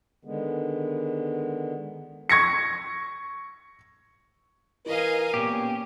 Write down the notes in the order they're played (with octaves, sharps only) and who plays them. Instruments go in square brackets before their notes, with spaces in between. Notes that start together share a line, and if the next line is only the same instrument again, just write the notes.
[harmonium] D3 D#3 G#3 B3
[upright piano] C#6 G#6 A#6 C#7
[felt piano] E3 B4 [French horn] A#4 [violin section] D#5 F5 G#5
[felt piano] A#2 B3 [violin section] C#4 [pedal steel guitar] G4